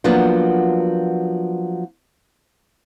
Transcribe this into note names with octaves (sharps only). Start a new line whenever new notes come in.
F3 F#3 A#3 B3 D4 F4